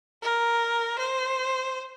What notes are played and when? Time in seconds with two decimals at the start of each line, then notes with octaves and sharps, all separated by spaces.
0.22 A#4
0.99 C5